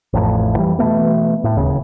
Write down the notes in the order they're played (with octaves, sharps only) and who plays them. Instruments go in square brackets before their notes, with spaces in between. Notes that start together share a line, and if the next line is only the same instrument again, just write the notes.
[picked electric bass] A1 F2 A2
E3 G3
B2 E3 A3 B3
A2
D1 D#2 C#3